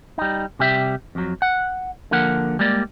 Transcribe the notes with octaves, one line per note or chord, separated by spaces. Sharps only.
G3 D#4
C3 G3 G4 E5
F2 F#3
F#5
D3 F3 A#3 A#4 F#5
G3 G#3 A#3 D5